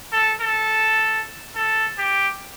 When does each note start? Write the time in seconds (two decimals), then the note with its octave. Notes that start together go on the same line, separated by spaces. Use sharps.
0.12 A4
0.41 A4
1.56 A4
1.98 G4